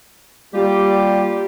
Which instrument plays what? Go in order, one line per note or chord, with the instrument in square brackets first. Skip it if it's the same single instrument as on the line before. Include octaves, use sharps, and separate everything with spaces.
[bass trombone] G3 [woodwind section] A#3 F4 G4